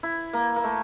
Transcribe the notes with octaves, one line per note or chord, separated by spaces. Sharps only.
E4
A#3
A#3
A3